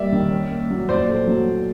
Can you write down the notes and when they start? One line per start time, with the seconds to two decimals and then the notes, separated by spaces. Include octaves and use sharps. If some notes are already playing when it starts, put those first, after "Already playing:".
Already playing: G3 A#3 D5 E5
0.12 D#3
0.31 C#4
0.50 A#3
0.70 F#3
0.89 A#2 C5 D5
1.09 A3
1.27 F#3